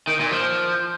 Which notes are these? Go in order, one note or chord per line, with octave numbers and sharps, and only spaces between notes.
D#3
A#2
F3